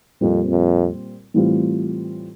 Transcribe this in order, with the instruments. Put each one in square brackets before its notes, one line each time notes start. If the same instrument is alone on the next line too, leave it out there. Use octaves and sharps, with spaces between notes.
[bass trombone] F2 [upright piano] A#2 G3 C4
[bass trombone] F2
[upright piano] A2 E3 G3 C4 F4